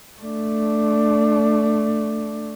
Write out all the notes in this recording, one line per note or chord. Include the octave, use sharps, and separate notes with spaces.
A3 D4